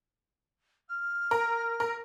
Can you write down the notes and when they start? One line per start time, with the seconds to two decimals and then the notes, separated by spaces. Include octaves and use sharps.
0.88 F6
1.31 A#4
1.80 A#4